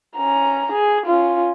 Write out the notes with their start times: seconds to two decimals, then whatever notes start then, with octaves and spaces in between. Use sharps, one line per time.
0.16 C#4 A#5
0.72 G#4
1.06 C#4 F4